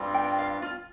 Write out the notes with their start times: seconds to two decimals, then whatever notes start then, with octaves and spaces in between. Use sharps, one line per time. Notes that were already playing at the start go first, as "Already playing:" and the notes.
Already playing: G2 G3 C4 F4
0.14 G5
0.38 F5
0.62 F4